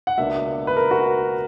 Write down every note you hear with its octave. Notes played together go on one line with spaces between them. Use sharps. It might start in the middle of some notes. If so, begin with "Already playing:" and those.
F#5
C#2 B2 A#3 D4 E5
B4
A#4
F#4